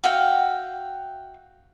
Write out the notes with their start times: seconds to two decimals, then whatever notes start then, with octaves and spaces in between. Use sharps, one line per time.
0.04 F#4 E5 F5 G5